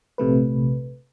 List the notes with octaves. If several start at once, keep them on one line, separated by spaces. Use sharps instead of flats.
A#1 C3 A3 B4